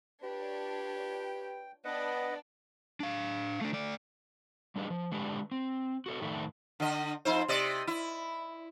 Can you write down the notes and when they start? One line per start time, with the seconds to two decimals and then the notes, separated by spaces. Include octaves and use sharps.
0.23 D4 F4 G4 B4 C#5
1.13 G5
1.85 B3 D4 B4 D5 D#5 F#5 G5
3.00 D4 F5
3.61 A3 D4
3.73 A3 D5
4.76 G3 D4 G#4 B4 D#5
4.90 F3
5.12 D3 G#3 D4 G4 B4
5.52 C4
6.06 F#4 A4 C#5
6.21 F2 A2 D#3 A3 D4 E4
6.80 D3 D#5
7.25 F2 D#4 C5
7.48 C3 D5 D#5
7.87 E4